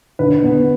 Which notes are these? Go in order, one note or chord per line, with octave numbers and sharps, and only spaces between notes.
D3 B4
B3